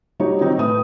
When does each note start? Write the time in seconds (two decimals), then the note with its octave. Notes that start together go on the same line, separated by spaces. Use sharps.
0.20 F#3 G3 D#4 G4 C#5
0.40 D#3 C4 D#4
0.58 A2 A3 E4 B4 D#6